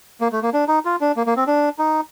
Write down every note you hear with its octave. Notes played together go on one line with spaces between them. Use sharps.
A#3
A3
A#3
D4
D#4
F4
D4
A#3
A#3
C4
D4
D#4